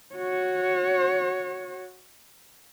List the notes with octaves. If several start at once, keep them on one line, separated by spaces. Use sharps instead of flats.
F#4 C#5